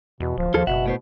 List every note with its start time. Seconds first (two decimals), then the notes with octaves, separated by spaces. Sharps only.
0.20 E2 B2
0.38 D1 F3
0.54 D#2 F3 F4 G#4 A4
0.67 F#1 B2 E5 F#5
0.86 A2 B3 C5